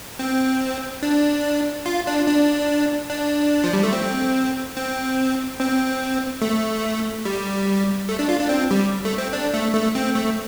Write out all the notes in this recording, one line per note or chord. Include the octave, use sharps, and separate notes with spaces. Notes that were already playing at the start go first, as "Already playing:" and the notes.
C4
D4
F4
D4
D4
D4
F3
G3
A3
C4
C4
C4
A3
G3
A3
D4
F4
D4
C4
G3
A3
C4
D4
A3
A3
C4
A3